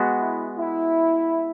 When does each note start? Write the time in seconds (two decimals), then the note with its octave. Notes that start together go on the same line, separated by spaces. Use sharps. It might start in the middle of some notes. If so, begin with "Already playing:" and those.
Already playing: G#3 B3 F#4
0.19 E4
0.58 E4